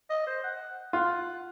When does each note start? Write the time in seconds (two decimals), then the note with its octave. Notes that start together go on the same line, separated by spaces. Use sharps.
0.10 D#5
0.27 C5
0.44 F#5
0.93 F4 F#5